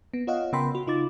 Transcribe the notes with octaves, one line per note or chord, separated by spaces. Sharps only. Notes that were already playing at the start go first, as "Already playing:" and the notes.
B3
F4 C#5 D#5 F5 F#5
C#3 B3 A#4 G5 B5 C6
F#4
C#3 D#4 F4 D6 A6